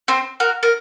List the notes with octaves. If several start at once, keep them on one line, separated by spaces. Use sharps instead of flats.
C4 C5
F#4 A#4
A#4